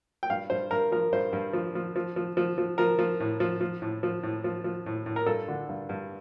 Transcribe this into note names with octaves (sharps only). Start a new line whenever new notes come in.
G5
G2 F5
G2 C5
G2 A#4
F3 A#4
G2 C5
G2
F3
F3
F3
F3
F3
F3
F3 A#4
F3
A2
F3
F3
A2
F3
A2
F3
F3
A2
A2
A#4
G2 A4
D3
G2
G2